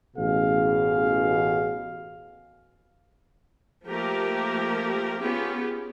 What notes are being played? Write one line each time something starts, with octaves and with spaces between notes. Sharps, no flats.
A1 B2 G#4 F5
F3 A3 A#3 G4 A#4
B3 C#4 F4 G4 G#4